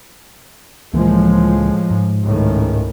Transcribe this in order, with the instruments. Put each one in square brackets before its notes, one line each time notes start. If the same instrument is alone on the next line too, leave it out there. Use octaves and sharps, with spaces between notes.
[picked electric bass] C#2 E3 A#3 [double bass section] A2 F3 G#3
[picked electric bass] G#2
[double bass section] C#2 A2 D#3